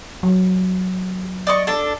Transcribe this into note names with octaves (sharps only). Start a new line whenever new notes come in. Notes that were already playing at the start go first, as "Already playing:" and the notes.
F#3
D5 D#5 C#6
D4 A4